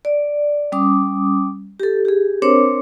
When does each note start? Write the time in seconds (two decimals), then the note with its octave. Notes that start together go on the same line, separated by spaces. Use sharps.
0.05 D5
0.72 G3 C#4 D6 D#6
1.80 G4 A4
2.05 G4 G#4
2.42 C4 D4 A#4 C5 C#5 D6